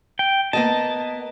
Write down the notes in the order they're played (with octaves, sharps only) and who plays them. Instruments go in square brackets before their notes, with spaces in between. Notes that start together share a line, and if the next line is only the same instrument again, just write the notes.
[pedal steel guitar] G5
[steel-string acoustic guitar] A#3 B3 D#5 [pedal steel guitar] A5